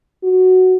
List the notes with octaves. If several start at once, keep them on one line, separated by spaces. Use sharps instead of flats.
F#4